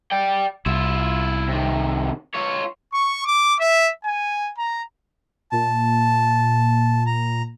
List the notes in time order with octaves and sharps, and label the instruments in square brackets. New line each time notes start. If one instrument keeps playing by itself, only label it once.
[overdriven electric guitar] D5 G5
[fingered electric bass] C2 [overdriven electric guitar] E4 F4
[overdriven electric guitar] C3 D#3
F4 C#5
[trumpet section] C#6
D6
E5
G#5
A#5
[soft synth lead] A#2 [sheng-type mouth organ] A5
[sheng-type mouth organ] A#5